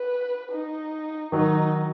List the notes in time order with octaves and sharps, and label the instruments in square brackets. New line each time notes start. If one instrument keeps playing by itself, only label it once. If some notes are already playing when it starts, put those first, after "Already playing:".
Already playing: [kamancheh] B4
D#4
[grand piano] D#3 F#3 [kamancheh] D#4